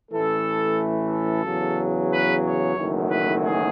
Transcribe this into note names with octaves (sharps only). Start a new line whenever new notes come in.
A1 A2 E3 A3 A4
A4
E2 C#3 F#3
B4
C#5
F#1 E2 D#3 F#3 A3
B4
G#4